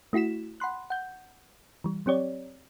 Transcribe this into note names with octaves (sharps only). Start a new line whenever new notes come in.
A3 E4 F#4 B6 E7
F#5 B5 C6 F#6
F#5 G6
E3 G3
F#3 C4 G4 C#5 D5